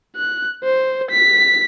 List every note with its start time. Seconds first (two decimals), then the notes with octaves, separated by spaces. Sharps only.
0.17 F#6
0.64 C5
1.11 B6